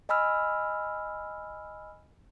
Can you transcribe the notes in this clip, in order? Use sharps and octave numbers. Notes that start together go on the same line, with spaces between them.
D#5 G#5 B5 E6 F6